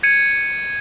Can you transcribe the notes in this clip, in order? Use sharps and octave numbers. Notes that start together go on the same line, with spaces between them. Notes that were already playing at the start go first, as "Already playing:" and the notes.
G#6 C#7 D#7